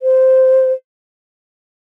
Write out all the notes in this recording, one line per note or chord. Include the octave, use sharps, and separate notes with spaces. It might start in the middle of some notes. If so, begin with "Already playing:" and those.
C5